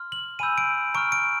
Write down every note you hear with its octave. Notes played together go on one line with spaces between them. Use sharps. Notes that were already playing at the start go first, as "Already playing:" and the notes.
Already playing: C6 F6
F#7
G#5 B5 E6 G6 D#7
D7
A#5 C#6 F6 D7
D7